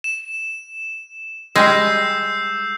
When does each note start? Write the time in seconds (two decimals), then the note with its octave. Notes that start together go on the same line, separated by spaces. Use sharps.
0.04 E7
1.56 G3 G#3 E6 G6 C7